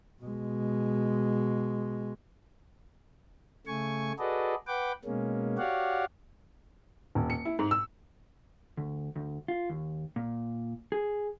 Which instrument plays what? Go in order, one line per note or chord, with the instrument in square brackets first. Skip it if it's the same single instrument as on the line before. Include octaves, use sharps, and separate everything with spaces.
[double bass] B2 G#3
[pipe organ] C#3 A3 G#5 C#6
F#4 G#4 A4 B4 D5 D#5
B4 F#5 G5 D6
B2 G#3 A#3 C#4
F#4 G4 C#5 D5 F5 F#5
[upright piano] D#1
C#7
E4
G#2
E6
[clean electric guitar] D2
D2
F4
D#2
A#2
G#4